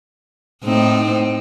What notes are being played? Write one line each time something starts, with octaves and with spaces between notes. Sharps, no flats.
A2 C4 D#4